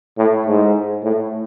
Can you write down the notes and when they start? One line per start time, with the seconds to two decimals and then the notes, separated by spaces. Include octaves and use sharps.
0.18 A2
0.46 G#2
1.04 A2